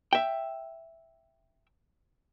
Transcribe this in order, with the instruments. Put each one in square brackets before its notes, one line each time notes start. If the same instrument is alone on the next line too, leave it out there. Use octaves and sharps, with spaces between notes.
[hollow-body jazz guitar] E5 G5